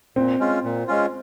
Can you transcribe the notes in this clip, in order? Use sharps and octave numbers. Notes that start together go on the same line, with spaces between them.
A#2 C4
G#3 C#4 F4
A#2
G#3 C#4 F4